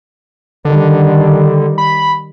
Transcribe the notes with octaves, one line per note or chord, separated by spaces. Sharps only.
D3 D#3 G3
B5